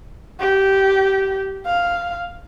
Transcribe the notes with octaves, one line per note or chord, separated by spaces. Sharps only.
G4
F5